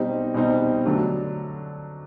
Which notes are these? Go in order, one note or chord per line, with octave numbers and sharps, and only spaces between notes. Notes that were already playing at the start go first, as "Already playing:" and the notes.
Already playing: B2 G3 C4 D#4
B2 G3 C4 D#4
D3 F#3 A3 D4